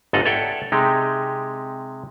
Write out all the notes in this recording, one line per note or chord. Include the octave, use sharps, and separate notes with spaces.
G1 G#2 A4 D#5 F5 F#5
A4 C#5 D5 E5 F#5 G5
C3 G#3 D#4 G4